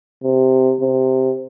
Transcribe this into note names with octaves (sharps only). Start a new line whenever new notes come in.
C3
C3